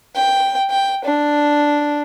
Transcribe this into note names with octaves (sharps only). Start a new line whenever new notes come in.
G5
G5
D4